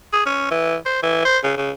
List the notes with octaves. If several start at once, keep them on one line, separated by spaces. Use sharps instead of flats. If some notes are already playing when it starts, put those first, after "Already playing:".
G#4
C#4
E3
C5
E3
C5
C#3
C#3